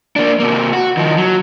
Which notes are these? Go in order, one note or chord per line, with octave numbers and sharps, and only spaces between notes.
A#3 D4
C3 A#3
F#4
D#3 F3
F#3